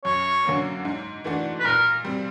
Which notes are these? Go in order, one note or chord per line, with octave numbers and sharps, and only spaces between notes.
F#2 C#5
D3 F#3 A#3 C#4
G#2
E3 A3 D4 F#4
B4
A#2 A#4
G3 C4